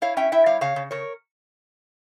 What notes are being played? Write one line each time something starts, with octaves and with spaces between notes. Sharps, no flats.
E4 C#5 F5
C#4 E5 G5
E4 E5 G5
G3 C#5 F5
C#3 C#5 F5
C#3
C#3 A#4 C#5